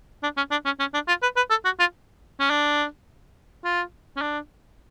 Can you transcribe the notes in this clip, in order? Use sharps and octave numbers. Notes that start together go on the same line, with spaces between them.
D4
C#4
D4
C#4
C#4
D4
F4
B4
B4
A4
F#4
F4
C#4
D4
F4
C#4
D4